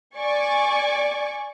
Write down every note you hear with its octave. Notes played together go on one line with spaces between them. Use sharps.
D5 G#5 C#6 D6